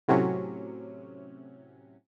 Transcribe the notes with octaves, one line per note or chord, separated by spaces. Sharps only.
A2 C3 F#3 C#4